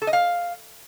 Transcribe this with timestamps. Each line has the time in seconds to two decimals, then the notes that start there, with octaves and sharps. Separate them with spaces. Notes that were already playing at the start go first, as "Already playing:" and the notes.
0.02 A4
0.07 D#5
0.13 F5